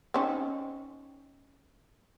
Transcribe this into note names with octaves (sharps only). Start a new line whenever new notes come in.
C4 C#4 D#4